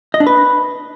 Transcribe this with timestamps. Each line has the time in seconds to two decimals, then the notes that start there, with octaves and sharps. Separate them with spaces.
0.14 D#5
0.20 D4
0.26 B4